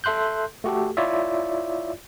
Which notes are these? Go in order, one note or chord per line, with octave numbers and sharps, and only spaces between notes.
A4 E5 C6 F#6 G6
A3 F#4 G4 A4
E4 F4 C#5 D5 E5